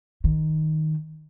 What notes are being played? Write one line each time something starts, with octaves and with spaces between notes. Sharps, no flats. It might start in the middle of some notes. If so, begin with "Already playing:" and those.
D#3